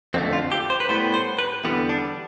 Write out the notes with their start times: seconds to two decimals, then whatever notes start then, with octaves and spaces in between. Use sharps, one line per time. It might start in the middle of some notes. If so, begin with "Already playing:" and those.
0.14 F2 D3 A3 C4
0.33 F4
0.52 G4
0.70 C5
0.80 B4
0.89 A2 G3 B3 C5
1.14 C5
1.39 B4
1.64 E2 D3 G3 B3
1.89 D4